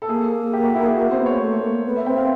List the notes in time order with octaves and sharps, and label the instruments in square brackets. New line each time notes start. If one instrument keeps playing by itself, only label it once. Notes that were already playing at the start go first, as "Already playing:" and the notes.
[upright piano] A4
[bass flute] A#3 [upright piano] G#4
[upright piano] G4
F#4
E4
G#4
F#4
[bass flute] C4 [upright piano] C5
[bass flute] B3
[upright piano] C#5
[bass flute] A#3
A3
A#3
B3
[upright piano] E5
[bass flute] C4 [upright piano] G5
[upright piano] F5